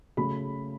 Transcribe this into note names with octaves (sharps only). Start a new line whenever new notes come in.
C#3 F#3 A3 B5